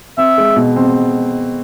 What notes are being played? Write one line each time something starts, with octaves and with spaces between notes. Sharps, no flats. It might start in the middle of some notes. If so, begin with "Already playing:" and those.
C4 E5
G#3
B2
C4